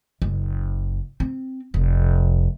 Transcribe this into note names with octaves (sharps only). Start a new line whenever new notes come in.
F#1
C4
F1